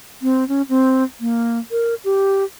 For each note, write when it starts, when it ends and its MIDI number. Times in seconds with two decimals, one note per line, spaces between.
0.22 0.47 60
0.48 0.62 61
0.69 1.04 60
1.20 1.59 58
1.71 1.95 70
2.05 2.44 67